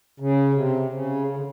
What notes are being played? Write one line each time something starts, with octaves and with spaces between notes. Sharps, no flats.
C#3
C3
C#3
C#3
D3